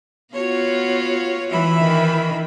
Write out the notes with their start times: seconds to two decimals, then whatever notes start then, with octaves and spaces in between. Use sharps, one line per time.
0.34 B3 F4 F#4 C#5
1.51 E3 E5 B5
1.80 D#3